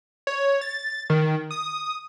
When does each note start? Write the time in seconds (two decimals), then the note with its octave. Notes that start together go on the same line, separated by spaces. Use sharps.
0.27 C#5
0.61 A6
1.10 D#3
1.51 D#6